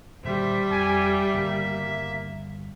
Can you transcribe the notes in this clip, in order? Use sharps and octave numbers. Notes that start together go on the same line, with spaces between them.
D#1 D3 G3 C5 E5
F2 G#5
G1 C#3 A#3